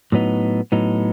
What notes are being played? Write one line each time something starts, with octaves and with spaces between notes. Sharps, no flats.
A2 F#3 B3 D#4
A2 F#3 B3 D#4